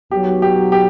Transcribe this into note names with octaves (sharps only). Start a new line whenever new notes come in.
B1 B2 F#3 G4
G4
G4